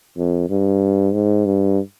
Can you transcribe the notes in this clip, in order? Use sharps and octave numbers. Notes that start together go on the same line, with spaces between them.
F2
G2
G#2
G2